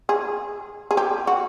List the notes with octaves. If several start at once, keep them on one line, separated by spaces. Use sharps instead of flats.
G#4
G#4
G4
F#4